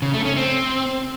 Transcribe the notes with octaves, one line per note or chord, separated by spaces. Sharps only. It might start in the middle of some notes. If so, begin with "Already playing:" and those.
C#3
A3
C#4
C4